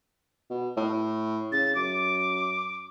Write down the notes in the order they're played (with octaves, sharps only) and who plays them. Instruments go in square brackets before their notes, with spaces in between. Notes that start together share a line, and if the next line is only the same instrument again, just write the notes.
[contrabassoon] B2
A2
[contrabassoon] C#3 [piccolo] A6
[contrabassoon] F#2 [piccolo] D6